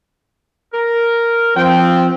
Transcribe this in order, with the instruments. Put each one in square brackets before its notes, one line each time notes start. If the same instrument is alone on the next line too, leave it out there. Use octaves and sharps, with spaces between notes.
[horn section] A#4
[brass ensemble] F3 C4 [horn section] G5